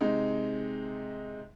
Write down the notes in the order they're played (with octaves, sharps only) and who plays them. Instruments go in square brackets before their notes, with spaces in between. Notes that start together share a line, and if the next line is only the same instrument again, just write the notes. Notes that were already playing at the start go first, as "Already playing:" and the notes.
[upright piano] C3 G#3 D#4